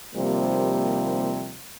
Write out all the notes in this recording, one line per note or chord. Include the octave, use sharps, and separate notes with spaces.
D#2 C3 F3 G3 A#3